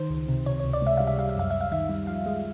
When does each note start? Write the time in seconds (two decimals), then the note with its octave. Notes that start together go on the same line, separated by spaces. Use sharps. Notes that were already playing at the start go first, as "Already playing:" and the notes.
Already playing: D#3 C5
0.10 C#2
0.28 C3
0.46 C3 C#5
0.60 C#2 C#5
0.73 D5
0.82 G#3 E5
0.97 G3 F5
1.07 E5
1.18 G3 F5
1.29 E5
1.36 F#2 F5
1.50 F#2 E5
1.61 F5
1.72 D#3 E5
1.89 G3
2.07 F3 F5
2.26 G#3